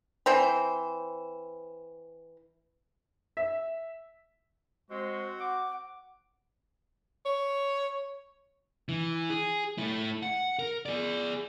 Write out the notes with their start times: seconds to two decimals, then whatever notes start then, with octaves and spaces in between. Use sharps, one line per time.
0.26 E3 C4 C5
3.37 E5
4.90 G#3 C4 F#4 C5
5.40 F#5 D6
7.25 C#5
8.89 E3
9.30 G#4
9.78 A3 E4
10.23 F#5
10.59 A#4
10.86 G#4 D5